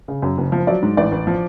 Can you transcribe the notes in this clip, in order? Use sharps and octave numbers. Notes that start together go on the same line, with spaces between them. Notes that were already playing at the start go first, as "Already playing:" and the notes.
C#3
F#2
F#1
F3
F#3 D5
G#2
A1 D5
A1
F3